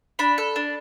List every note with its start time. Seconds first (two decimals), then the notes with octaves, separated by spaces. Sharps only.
0.19 D4 B5
0.38 A4
0.56 D4